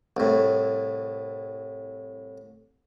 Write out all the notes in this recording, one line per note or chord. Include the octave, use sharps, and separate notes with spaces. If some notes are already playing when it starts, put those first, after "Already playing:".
C2 A2